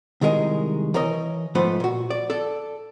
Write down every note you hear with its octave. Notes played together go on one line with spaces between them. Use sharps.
C2 D#3 G#3 A#4 D#5
E3 A#4 C#5 D#5
G#2 F3 A3 B3 B4 C5
A#2 F#4
D5
A4 D5